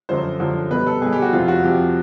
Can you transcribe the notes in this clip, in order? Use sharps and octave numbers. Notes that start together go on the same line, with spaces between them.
F#2 D3 F3 C5
F#2 D3 F3
B2 G3 B4
A4
B2 G3 G#4
G4
F#4
F2 C3 F3 F4
F#4
F2 C3 F3 G4